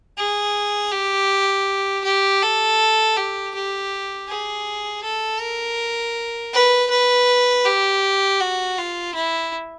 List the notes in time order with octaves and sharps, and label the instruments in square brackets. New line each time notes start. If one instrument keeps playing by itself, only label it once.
[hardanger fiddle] G#4
G4
G4
A4
G4
G4
G#4
A4
A#4
B4
B4
G4
F#4
F4
E4